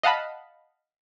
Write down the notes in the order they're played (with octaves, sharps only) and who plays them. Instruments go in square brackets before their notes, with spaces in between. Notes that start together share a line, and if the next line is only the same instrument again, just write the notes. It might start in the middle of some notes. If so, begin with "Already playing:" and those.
[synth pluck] D#5 F5 F#5 A5 B5